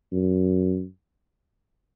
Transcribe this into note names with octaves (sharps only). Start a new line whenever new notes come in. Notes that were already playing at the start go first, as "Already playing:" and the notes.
F#2